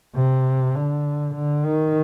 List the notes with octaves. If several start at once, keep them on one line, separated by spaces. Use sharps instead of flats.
C3
D3
D3
D#3